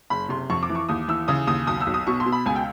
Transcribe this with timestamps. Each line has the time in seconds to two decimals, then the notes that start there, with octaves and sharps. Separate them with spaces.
0.10 F#1 B5
0.29 C3 C6
0.50 F2 C#6
0.63 D6
0.69 E3
0.75 C#6
0.89 D#2 D#6
1.08 E3 E6
1.28 C#3 D#6
1.47 D#2 D#6
1.67 B1 D#6
1.81 E6
1.87 B1
1.94 D#6
2.07 B2 C#6
2.20 C6
2.26 B2
2.32 B5
2.46 C#2 G#5
2.56 G5